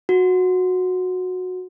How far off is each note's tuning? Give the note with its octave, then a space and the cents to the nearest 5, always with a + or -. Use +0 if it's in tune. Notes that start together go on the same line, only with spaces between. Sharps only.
F#4 -15